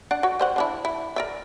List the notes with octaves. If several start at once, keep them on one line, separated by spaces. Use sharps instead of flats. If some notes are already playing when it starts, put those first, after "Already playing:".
D4 D5 F#5
F#4 C#5
G3 C5 F#5
D3 D4 E4
E4
A#4 D5 E5